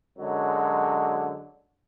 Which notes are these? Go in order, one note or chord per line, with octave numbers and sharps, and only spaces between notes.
F#2 D3 F#3 G#3